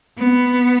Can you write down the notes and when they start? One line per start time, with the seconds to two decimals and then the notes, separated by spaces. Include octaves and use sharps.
0.18 B3